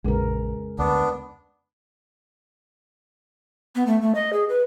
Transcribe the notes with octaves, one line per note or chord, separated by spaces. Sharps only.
A#1 F2 C#3 G#3 C#4 A#4
D2 B3 D4
B3
A3
A3
D#5
G#4
B4